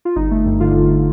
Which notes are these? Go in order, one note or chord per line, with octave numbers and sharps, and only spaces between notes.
F4
G1 D#4
A3
G2
D3 F4
G1